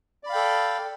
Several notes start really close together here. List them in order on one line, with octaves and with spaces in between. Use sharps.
D5 B5 F5 G5 A4